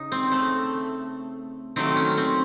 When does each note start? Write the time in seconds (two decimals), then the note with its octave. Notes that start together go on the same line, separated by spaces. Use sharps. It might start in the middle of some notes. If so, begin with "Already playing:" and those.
Already playing: C#3 D#4
0.12 C4
0.32 A3
1.76 D#3 F#3 A3 C4
1.96 C#4
2.17 C4